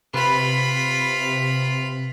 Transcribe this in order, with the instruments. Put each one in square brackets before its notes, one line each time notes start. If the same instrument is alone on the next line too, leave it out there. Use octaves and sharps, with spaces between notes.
[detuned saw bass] C3 [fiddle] F4 B5 [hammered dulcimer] B4